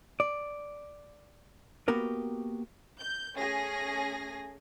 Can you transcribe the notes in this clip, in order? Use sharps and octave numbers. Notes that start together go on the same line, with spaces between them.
D5
A#3 B3 F#4 G4 A#4 B4
G6
A3 C#4 G#4 G#5 A#6